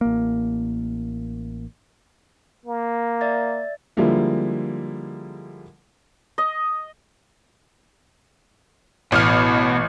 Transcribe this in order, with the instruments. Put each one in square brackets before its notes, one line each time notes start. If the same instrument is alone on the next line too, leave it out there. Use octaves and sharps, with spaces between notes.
[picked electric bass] A1 A#3
[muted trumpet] A#3
[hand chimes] D5 E5 A6
[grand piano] D3 F3 G3 G#3 A#3 E4
[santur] D#5
[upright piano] A1 F6 [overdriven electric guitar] B2